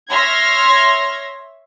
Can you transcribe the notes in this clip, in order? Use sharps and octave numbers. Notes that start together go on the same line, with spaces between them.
C#5 E5 C6 F6 G#6 A#6